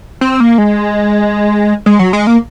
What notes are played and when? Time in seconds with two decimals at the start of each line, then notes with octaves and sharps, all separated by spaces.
0.21 C4
0.40 A#3
0.58 G#3
1.86 G#3
1.99 F#3
2.13 G#3
2.27 A#3